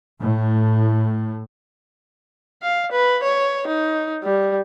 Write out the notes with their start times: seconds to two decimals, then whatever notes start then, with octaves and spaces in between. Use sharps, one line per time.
0.21 A2
2.63 F5
2.92 B4
3.23 C#5
3.67 D#4
4.23 G3